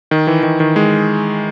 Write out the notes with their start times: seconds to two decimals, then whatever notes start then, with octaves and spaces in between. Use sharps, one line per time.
0.11 D#3
0.27 E3
0.43 D#3
0.60 D#3
0.76 G#3